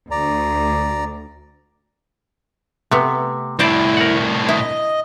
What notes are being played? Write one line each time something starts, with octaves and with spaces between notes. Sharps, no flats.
D2 D5 A#5
C3 A3 B3
C2 A2 E4 C5 D5 A5
A#4 F#5
E4 D#5